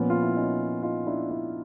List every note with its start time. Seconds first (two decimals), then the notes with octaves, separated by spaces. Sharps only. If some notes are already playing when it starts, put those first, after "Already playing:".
Already playing: A#2 F3 B3 C#4
0.10 F4
0.22 E4
0.37 C#4 D#4
0.83 D#4 F4
1.06 D4 E4
1.30 D4 E4